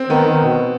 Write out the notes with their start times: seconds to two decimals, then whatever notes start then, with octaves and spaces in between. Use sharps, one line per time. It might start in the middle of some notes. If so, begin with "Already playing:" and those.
Already playing: C4
0.10 D#3 B3
0.26 D#3
0.45 B2